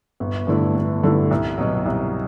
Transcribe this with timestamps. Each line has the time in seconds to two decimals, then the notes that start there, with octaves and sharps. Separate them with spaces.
0.20 G1
0.47 G2 D3 A3 E4
0.75 G1
1.03 G2 D3 A3 E4
1.31 C2
1.58 B2 F#3
1.86 C2